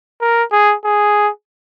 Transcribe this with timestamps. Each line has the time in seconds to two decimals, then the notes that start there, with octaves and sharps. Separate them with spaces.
0.21 A#4
0.52 G#4
0.85 G#4